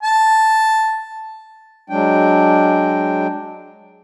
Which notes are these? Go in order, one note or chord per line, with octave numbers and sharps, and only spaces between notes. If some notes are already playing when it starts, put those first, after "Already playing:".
A5
F#3 G#3 D4 G5